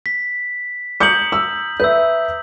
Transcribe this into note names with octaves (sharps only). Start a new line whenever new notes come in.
B6
A#5 D#6 G6 C#7 F#7
E6
B4 E5 E6 G6